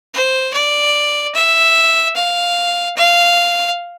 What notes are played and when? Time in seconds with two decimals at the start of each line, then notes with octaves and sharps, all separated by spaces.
0.14 C5
0.54 D5
1.35 E5
2.16 F5
2.97 F5